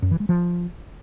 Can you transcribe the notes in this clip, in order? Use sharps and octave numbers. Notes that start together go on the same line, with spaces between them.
F#2
E3
G#3
F3